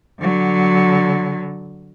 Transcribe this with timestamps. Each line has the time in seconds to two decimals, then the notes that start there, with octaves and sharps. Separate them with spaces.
0.20 D3 F#3